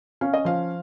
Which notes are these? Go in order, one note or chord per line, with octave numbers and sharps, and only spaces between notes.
C#4 F5
D#5
F3 F5